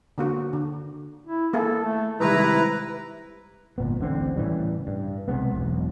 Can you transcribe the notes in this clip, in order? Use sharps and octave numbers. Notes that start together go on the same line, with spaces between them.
D3 A#3 F#4
D3
E4
A#3 E4 G#4 A4
A3
C3 D#3 G3 G#3 E4 B4 A#5
G1 A#2 B3
D1 A1 D3 C4
A2 C#3 E3 G3
G2
B1 C3 G#3 B3
E1 B1